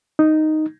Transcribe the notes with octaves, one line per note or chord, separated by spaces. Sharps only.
D#4